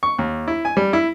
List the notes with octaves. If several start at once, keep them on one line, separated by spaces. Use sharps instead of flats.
C#6
D#2
E4
G#5
G3
E4